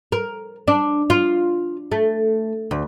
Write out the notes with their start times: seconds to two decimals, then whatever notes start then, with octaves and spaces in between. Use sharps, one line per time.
0.12 A#4
0.68 D4
1.10 F4
1.92 A3
2.71 D2